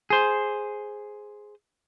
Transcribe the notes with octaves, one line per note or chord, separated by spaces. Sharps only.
G#4 C5